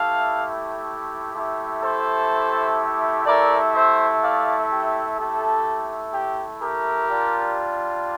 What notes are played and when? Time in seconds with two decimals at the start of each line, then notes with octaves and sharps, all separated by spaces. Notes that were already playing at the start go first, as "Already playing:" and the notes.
Already playing: A3 E4 G4 F5 A5
1.34 A3 E4 G4
1.82 A4 C5
3.25 A3 E4 G4 A#4 D5
3.74 C5 E5
4.22 D5 F5
4.69 G4
5.17 A3 E4 G4 A4
6.13 G4
6.61 G4 A#4
7.09 G3 D4 F4